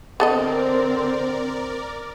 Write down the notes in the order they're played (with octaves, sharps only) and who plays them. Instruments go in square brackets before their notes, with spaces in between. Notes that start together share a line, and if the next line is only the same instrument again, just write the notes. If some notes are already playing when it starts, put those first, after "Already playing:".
[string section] D3 C4 [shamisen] B3 A4 D#5 [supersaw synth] A#4 D5